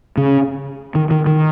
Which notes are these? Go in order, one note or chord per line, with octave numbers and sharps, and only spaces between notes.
C#3
D#3
D#3
D#3